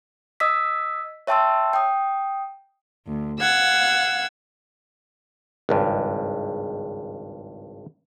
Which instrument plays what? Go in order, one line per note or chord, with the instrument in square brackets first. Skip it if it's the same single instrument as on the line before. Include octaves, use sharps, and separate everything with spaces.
[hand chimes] D#5 D#6 E6 B6
C#5 E5 G5 A5 C6 E6
G5 D#6
[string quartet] D2
F5 F#5 E6 G#6
[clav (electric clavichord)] G#1 C#2 G2